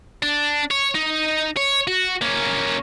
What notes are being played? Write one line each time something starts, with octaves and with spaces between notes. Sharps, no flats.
D4
C#5
D#4
C#5
F#4
A#3 C#4